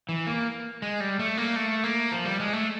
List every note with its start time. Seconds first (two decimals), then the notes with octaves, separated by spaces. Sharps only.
0.09 E3
0.27 A#3
0.82 G#3
1.00 G3
1.19 A3
1.37 A#3
1.56 A3
1.84 A#3
2.12 F3
2.25 G3
2.39 G#3
2.53 A3